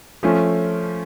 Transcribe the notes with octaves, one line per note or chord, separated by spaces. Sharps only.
F3 A3 C#4